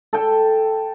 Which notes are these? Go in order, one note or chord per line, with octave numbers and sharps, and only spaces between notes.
A4 G5